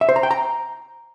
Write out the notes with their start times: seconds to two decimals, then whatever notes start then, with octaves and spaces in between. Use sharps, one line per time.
0.01 E5
0.09 C5
0.16 A#5
0.23 G5
0.31 A#5